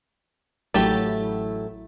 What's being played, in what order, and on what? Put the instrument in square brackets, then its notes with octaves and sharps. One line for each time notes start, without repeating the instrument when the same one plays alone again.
[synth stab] A1 F#3 E4 [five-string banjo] A3 G4